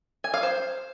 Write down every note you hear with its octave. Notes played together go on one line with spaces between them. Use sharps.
G#5
F5
C5